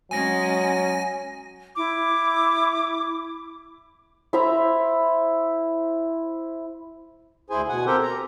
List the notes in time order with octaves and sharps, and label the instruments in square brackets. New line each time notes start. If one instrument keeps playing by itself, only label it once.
[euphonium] F#3 [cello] G#3 C#4 [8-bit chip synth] G#5 A#6
[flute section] E4 D6
[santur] E4 C5 E5 A#5
[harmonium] D2 E4 G#4 C5 G#5
B2 F#5 G#5
C4 G4 A4 A#4 C5 G5
A#5